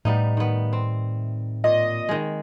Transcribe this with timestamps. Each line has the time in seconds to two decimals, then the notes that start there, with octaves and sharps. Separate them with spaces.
0.05 A2 G3 B3 D#4
0.37 D#3 B3
0.73 C4
1.64 A#2 D#5
2.09 D#3 G#3